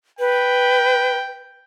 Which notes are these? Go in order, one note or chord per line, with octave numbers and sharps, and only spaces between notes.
B4 G5